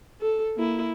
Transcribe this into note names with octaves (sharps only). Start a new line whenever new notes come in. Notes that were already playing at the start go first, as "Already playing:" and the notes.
A4
A#3 E4